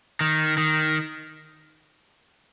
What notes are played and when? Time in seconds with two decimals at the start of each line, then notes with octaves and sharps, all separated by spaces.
0.21 D#3
0.58 D#3